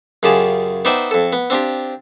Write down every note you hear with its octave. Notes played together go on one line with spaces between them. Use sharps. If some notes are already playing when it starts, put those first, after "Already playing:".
F#2 C#3 F4 G4 G#4 A5
B3 D#4 C5 D5 E5 G5
F2 A4
B3
C4 D4 F4 G4